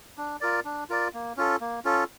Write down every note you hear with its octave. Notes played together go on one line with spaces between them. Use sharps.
D4
F4 A#4 D5
D4
F4 A#4 D5
A#3
C#4 F4 A4
A#3
C#4 F4 A4